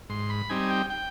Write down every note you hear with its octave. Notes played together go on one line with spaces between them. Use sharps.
G#2 C6
B5
G3 C4 D#4 G#5
G5
G5